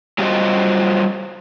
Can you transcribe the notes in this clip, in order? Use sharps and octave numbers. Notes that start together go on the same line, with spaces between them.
F#3 G3 F4 F#4 C5 D#5